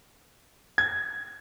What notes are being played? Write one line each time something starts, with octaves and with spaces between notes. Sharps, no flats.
G#6